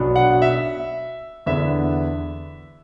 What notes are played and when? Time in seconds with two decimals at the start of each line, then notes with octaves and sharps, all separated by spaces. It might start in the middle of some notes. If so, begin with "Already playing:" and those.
Already playing: B1 B2 B3 D4
0.16 F#5
0.42 E5
1.46 E2 D3 B3 D4 E5